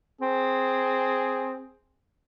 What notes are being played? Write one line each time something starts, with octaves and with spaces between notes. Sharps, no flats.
C4 G#4